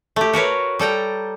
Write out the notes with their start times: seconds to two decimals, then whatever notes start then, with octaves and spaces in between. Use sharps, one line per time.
0.16 A3 G4
0.33 F#4 A#4 B4 C#5
0.79 G3 A4 G5 A#5